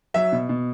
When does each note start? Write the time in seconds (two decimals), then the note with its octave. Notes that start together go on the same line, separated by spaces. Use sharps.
0.14 F#3 E5
0.32 B2
0.49 B2